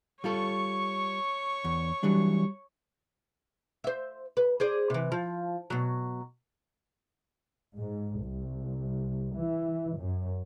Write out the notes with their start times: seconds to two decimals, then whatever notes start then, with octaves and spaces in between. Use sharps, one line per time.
0.24 G3 F4 A4 C#5 C#6
1.64 E2
2.03 E3 F#3 G3 D4
3.84 C5 E5
4.37 B4
4.60 G#4 C5 D5
4.90 C3 E3
5.12 F3
5.70 B2 F#3
7.76 G#2
8.23 C2
9.35 E3
9.99 F#2